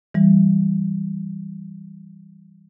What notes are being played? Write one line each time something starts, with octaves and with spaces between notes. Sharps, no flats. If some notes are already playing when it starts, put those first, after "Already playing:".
E3 G3